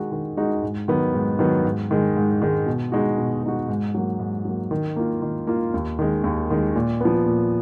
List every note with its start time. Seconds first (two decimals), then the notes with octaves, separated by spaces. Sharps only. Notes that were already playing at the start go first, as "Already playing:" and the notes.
Already playing: D#3 G#3 D#4 F#4
0.12 D#3
0.37 G#3 D#4 F#4
0.62 G#2
0.88 D#3 F#3 B3
1.14 G#2
1.39 D#3 F#3 B3
1.65 G#2
1.91 D#3 G#3
2.16 G#2
2.42 D#3 G#3
2.66 B2
2.92 G#3 D#4 F#4
3.18 B2
3.43 G#3 D#4 F#4
3.68 G#2
3.94 F#3 A#3
4.19 G#2
4.45 F#3 A#3
4.71 D#3
4.96 A#3 F4
5.22 D#3
5.47 A#3 F4
5.74 D#2
5.99 D#3 G#3
6.24 D#2
6.50 D#3 G#3
6.75 A#2
7.00 F3 B3
7.26 A#2